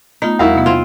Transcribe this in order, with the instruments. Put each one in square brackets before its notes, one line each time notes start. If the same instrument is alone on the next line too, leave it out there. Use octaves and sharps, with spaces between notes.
[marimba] A3 B3 F4 [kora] D#4
[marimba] E2 G3 B5 [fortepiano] E4 F#4 F5
[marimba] C3 B3
[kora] C4 F4 [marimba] E6 G#6